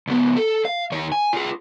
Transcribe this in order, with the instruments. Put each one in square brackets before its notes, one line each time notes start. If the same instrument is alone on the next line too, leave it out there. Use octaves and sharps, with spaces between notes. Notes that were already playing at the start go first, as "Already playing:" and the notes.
[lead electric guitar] C#2 B3
A4
F5
D#2 C#5
G#5
F4 G#4